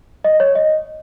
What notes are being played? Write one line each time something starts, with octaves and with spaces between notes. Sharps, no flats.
D#5
C#5
D#5